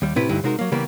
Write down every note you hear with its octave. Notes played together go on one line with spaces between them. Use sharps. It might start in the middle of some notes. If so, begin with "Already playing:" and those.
D#2 G3
A2 C3 E4 B4
D2 G2 D3 D#4 E4
C3 G#3 D#4 F#4 A#4
F#3 A#3
C#3 E3 G3 A#3 B3